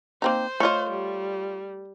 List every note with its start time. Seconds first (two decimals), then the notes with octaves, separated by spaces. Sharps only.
0.22 A#3 C4 D#4 C5
0.60 A3 F4 C#5 D#5
0.90 G3